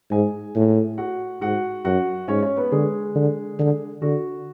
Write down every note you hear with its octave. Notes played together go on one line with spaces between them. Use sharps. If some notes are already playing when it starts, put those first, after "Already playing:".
G#2 G#4 G#5
A2
F#4 F#5
G#2 F#4 F#5
F#2 F#4 F#5
G#2 C#4 C#5
C#4 C#5
B3 B4
D3 G#3 G#4
D3
D3
D3 F#4